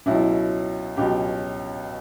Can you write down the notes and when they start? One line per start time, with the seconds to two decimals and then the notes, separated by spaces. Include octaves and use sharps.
0.06 C#2 B2 F#3 E4
0.97 C#2 B2 F#3 G4